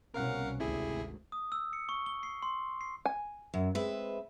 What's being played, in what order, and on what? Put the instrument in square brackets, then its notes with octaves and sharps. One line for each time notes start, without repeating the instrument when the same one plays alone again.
[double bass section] C2 B2 C#4 [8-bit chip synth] A#4 F5 F#5
[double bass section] G#1 D2 [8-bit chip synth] C3 E4 G#4
[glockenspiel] D#6
E6
C#7
C#6
G7
C7
C6
C7
[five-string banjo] G#5
[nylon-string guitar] F#2 [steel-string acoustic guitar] F#3
[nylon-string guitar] G#3 C4 [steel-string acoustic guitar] B4 E5